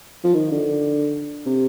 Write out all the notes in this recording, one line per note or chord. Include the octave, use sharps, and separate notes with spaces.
F3
D#3
D3
C3